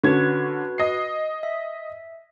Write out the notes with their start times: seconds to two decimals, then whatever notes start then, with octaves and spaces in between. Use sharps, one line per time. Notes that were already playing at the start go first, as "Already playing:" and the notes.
0.04 D3 C#4 F#4 B4 G#6
0.78 D#5 C7
1.43 E5